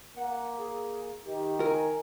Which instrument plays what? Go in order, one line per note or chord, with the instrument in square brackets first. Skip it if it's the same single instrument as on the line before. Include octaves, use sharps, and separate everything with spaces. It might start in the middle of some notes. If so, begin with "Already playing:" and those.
[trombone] A#3 [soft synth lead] F#5
[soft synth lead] G#4
[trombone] D#3 [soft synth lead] G4
[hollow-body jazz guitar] A#4 [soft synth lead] G#5